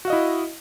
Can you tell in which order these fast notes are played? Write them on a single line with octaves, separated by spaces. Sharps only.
F#4 F5 D#5 E4